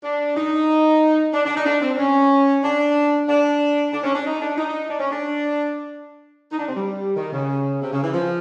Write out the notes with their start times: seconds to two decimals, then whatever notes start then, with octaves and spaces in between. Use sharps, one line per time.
0.03 D4
0.36 D#4
1.33 D4
1.45 D4
1.55 D#4
1.65 D4
1.81 C4
1.98 C#4
2.63 D4
3.28 D4
3.93 D4
4.03 C#4
4.14 D4
4.25 D#4
4.41 D4
4.58 D#4
4.89 D4
5.00 C#4
5.11 D4
6.52 D#4
6.59 D4
6.68 C4
6.75 G3
7.16 D#3
7.33 C#3
7.81 C3
7.92 C#3
8.03 E3
8.13 F3